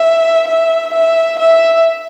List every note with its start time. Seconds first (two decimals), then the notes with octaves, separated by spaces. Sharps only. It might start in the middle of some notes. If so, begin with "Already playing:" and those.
Already playing: E5
0.48 E5
0.93 E5
1.39 E5